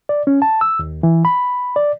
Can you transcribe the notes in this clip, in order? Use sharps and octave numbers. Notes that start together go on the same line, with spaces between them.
D5
C#4
A5
E6
D#2
E3
B5
D5